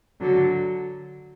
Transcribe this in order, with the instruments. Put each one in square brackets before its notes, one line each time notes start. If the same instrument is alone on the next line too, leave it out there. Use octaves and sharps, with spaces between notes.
[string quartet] D3 F#3